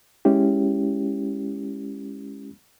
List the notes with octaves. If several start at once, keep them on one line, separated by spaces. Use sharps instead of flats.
G#3 C#4 E4 G4